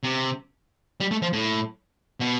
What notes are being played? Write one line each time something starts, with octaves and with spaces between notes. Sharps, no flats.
C3
G3
A3
F3
A2
B2